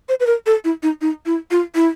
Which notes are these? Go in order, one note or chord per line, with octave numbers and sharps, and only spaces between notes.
C5
B4
A#4
A4
E4
D#4
D#4
E4
F4
E4